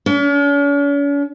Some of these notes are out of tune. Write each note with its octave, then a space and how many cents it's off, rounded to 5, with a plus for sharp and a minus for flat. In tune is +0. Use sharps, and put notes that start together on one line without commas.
C#4 +45